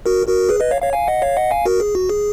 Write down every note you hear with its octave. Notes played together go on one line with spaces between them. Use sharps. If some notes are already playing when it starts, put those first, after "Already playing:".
F#4 A#4
F#4 A#4
G#4 B4
B4 D#5
C#5 F5
C#5 F5
F5 G#5
D#5 F#5
C#5 F5
D#5 F#5
F5 G#5
F#4 A#4
G#4
F#4
G#4